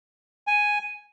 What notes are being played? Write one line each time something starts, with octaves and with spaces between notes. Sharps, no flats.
G#5